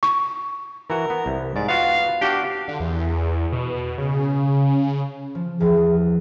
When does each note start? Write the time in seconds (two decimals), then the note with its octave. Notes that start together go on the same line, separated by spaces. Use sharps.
0.03 C#6
0.90 E3 F#4 A#4
1.10 B3
1.26 C2
1.56 G#2 D5
1.69 B3 F4 F#4 F5
2.21 D4 F#4 G4 F5
2.68 D3
2.80 E2
3.52 B2
3.98 C#3
5.35 F3
5.60 E2 F3 G#4